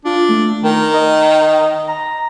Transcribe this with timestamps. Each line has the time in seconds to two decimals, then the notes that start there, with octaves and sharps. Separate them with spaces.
0.05 D4 F4
0.29 A3
0.64 D#3 A#4
0.94 D#5
1.88 A#5